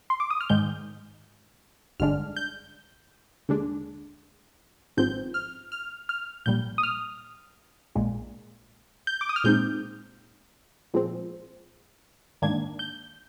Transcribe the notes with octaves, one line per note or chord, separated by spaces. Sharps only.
C6
D6
D#6
F6
G#2 D#3 G#3 G6
G#1 G2 D3 G#3 D4 F6
G6
D#2 D3 G#3 D4
G#1 G#2 F3 C4 G6
F6
F6
F6
A#1 A#2 G3 G6
D#6
F6
A#1 A#2 G#3
G6
D6
D#6
F6
A#2 G#3 C4 D#4 G6
A#2 F3 G#3 C4
G#2 D#3 A#3 D4 G#6
G6